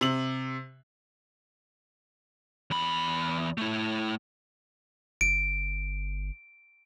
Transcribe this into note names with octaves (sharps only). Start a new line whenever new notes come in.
C3 F#7
E2 B5
A3 E4
G1 D7